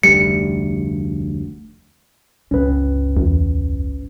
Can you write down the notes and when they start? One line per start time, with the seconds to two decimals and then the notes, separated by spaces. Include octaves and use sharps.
0.03 F1 D2 G3 C#7
2.51 G1 C#2 C#4 B4
3.17 E2